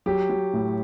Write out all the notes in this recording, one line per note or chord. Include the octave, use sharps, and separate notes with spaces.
F#3 G4
F#3
A2